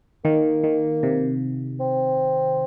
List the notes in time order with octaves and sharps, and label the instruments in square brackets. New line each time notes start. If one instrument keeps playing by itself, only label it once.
[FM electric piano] D#3 [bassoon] A#3
[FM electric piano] D#3
C3
[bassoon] C4